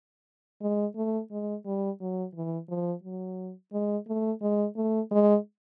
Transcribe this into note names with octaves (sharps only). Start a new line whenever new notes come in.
G#3
A3
G#3
G3
F#3
E3
F3
F#3
G#3
A3
G#3
A3
G#3